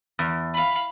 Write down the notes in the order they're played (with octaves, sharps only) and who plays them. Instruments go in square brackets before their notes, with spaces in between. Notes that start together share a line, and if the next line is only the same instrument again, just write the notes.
[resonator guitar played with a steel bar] E2
[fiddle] F5 B5